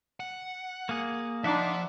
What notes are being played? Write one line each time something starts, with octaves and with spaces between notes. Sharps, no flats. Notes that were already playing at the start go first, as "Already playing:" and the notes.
F#5
A#3 G#4
F3 D4 D#4 E5 F#5 C6 D6